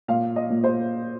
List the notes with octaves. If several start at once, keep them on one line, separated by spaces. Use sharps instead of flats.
A#2 F5
D#5
A#2
C5